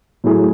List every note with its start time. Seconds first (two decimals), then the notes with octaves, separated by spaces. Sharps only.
0.24 A2 F#3 A3 E4 G#4